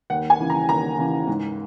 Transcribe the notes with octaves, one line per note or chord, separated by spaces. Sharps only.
D#2 F#5
G#5
C#3 E3
A#5
D#2 A#5
C#3 E3
G#2